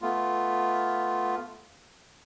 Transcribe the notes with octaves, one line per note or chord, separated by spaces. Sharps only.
A3 B3 F4